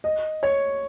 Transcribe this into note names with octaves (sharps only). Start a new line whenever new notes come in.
D#5
C#5